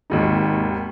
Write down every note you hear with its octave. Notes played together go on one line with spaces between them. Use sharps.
G#1 D#2 D#4